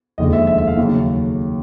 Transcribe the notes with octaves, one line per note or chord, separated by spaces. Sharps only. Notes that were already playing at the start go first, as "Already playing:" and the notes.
F1 D#2 D3 F3 G#3 D#5
E5
E5
E5
F5
D#2 C#3 F#3